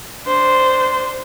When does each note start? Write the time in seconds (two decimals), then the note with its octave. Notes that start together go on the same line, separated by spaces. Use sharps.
0.24 D4 C5